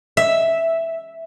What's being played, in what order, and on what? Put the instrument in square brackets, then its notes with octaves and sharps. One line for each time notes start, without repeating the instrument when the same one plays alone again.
[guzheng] E5